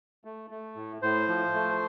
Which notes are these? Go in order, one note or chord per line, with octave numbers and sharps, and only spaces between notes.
A3
A3
A2
A2 C5
F3
A3